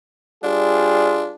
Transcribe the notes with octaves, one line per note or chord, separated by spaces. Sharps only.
G3 D4 F4 G#4